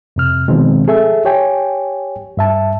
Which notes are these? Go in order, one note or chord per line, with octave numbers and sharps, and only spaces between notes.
F2 C3 F6
B2 D#3 F3 G#3 C4
G#4 A4 E5
G4 C#5 G5 G#5
G2 E5 A5